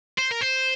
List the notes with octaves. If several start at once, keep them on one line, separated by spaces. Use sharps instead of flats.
C5
A#4
C5